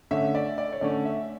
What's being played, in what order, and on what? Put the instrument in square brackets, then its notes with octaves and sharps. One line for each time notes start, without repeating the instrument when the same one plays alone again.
[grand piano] D3 A3 C#4 E5
D5
D5
C#5
D3 A3 C#4 D5
E5